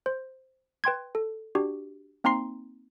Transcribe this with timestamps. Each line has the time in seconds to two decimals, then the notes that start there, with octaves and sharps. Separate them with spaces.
0.06 C5
0.84 B4 G5 C6 G#6
1.15 A4
1.55 D4 F#4 G4
2.24 A#3 C4 D#4 A#5 C6 C7